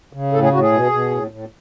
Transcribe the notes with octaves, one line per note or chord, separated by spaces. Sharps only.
C#3
A2 A4
G#4
A2 F#4
G#4
B2
B2
A2
A2